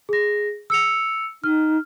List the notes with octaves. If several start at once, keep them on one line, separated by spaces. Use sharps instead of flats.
G#4 A#6
E6 C#7 F7
D#4 F6